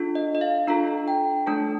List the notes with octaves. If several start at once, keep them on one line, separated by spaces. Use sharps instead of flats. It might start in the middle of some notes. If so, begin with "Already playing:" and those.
Already playing: D4 F4 A4
D#5
D#5
F5
D4 F4 A4 A#5
G5
A3 D4 A4 A5